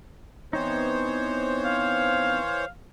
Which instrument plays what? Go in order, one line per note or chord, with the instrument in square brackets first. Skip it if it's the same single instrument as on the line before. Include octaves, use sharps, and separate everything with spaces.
[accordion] E3 C5 C#5 [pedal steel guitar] B3 C4 D#4
[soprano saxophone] F5